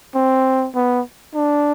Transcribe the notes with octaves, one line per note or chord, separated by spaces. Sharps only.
C4
B3
D4